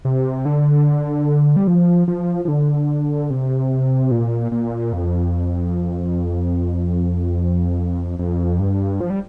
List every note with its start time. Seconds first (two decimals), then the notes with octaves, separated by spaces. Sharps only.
0.05 C3
0.45 D3
1.56 G3
1.67 F3
2.08 F3
2.45 F3
2.48 D3
3.30 C3
4.11 A#2
4.52 A#2
4.93 F2
8.19 F2
8.59 G2
9.01 F3
9.10 G3